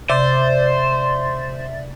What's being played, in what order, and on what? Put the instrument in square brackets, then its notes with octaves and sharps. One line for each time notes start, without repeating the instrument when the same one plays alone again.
[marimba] C3 [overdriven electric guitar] C5 [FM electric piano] D5 E5 A6